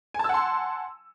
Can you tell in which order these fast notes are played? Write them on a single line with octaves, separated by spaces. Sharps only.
G#5 A5 E6 F#5 C6